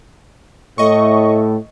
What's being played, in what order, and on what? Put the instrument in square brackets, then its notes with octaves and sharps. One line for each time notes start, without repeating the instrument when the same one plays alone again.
[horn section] A2 A3 [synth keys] D#5 C#6